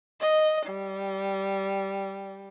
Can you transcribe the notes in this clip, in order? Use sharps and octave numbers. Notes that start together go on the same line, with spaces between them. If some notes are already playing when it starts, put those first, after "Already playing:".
D#5
G3